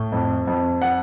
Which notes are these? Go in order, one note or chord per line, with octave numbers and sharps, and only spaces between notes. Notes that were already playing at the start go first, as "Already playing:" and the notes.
Already playing: A2
F2
F2
F#5